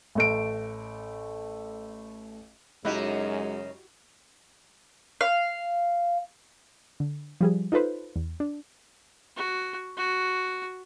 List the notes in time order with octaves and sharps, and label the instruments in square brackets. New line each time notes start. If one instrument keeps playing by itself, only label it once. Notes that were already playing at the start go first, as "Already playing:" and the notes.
[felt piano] A1 A3 D7
[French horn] F#2 [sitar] C#3 D#4 [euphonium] G#3 [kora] E4 F#4 G4
[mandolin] F5
[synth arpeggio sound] D3
F3 G3 G#4
D#4 F4 A4 B4 C5
E2
D4
[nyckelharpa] F#4
F#4